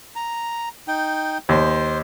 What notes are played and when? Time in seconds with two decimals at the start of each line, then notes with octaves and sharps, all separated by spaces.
0.16 A#5
0.88 D#4 G5
1.49 D#2 C5